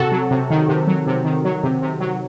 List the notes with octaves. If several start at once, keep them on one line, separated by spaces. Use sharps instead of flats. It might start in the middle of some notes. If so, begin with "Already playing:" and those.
Already playing: C3 F#4 A4
F#3
C3
D#3
C3
F#3
C3
D#3
F#3
C3
C3
F#3